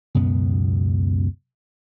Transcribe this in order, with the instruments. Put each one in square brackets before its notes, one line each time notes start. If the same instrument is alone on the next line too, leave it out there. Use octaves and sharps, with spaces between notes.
[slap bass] C#2 F#2 B2 B3